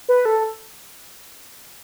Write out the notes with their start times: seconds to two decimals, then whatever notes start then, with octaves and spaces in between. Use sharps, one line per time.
0.09 B4
0.25 A4